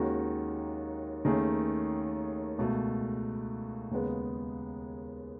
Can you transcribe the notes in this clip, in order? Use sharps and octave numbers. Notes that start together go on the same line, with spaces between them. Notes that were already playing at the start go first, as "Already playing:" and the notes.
Already playing: D#2 D#3 G#3 C#4 F#4
D#2 D#3 A3 C#4 G#4
C#2 B2 A3
D#2 C#3 G#3 B3